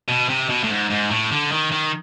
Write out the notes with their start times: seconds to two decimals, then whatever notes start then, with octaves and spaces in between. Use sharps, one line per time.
0.08 B2
0.29 C3
0.49 B2
0.63 A2
0.69 G#2
0.90 G#2
1.10 A2
1.31 D3
1.52 D#3
1.72 D#3